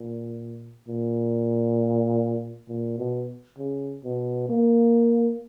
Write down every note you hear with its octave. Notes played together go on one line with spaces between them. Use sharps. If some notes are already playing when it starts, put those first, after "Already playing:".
Already playing: A#2
A#2
A#2
B2
C#3
B2
A#3